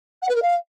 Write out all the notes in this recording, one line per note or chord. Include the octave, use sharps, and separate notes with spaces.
F#5
B4
A#4
F5